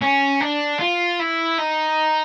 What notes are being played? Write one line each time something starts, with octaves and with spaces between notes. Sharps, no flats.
C#4
D4
F4
E4
D#4